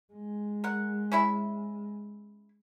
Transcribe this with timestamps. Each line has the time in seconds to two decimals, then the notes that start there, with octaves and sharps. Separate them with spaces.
0.13 G#3
0.64 A#4 F#5
1.12 C#4 E4 E5